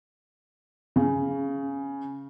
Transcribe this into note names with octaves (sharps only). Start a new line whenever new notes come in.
C#3